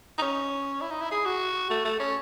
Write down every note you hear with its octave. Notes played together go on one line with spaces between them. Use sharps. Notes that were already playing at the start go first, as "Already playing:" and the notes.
D#4
C#4
E4
D#4
E4
G#4
F#4
A3
A3
C#4